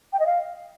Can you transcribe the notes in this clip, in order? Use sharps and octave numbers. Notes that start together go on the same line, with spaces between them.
G5
D#5
F5